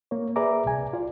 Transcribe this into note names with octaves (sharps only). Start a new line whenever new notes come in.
A#3 C#5
G#4 B4 D5 E5 A#5 D6
C2 G#5
F4 D5